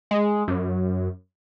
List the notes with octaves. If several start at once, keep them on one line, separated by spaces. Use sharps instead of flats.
G#3
F#2